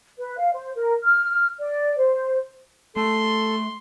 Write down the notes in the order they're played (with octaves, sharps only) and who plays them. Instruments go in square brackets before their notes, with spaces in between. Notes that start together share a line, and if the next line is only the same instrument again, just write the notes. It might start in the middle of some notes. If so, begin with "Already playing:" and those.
[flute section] B4
F5
C5
A#4
F6
D5
C5
[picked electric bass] A3 [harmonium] A4 [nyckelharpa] C6